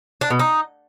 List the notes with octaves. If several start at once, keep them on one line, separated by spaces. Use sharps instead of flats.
D4
B2
D#4